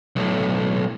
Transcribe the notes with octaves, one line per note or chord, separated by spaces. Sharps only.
B1 A2